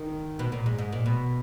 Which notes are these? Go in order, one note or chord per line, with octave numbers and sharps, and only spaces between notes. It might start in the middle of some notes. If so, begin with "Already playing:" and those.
Already playing: D#3
B2
A#2
G#2
G#2
A#2
B2